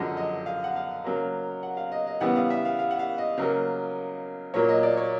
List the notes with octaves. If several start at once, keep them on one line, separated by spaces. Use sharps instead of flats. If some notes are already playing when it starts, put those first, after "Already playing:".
Already playing: F#2 D3 F3 G#3 D#5
D#5
F5
F#5
F5
C#3 F#3 A#3
F#5
F5
D#5
D#5
C#3 E3 G3 B3 F#5
F5
E5
F5
F5
F#5
F5
D#5
C#3 F#3 A#3
A#2 F#3 A#3 C#5
D#5
D5
C#5